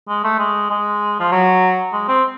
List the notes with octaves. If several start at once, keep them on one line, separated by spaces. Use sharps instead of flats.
G#3
A3
G#3
G#3
F3
F#3
G#3
C4